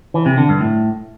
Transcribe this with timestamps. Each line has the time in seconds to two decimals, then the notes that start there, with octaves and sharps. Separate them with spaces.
0.14 E3
0.26 C3
0.37 D3
0.49 G2
0.61 A2